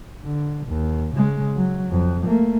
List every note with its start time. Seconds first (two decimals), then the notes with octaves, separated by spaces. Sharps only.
0.23 D3
0.67 D#2
1.16 C#3 G#3
1.56 F#3
1.91 F2
2.23 A3 A#3